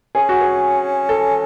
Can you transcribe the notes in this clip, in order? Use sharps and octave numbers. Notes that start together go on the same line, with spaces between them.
C#4 G#4
F#4
G#4
A4